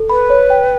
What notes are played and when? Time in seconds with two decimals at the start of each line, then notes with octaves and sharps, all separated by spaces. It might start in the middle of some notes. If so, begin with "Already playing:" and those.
Already playing: A4
0.10 B4 B5
0.30 C#5
0.50 G5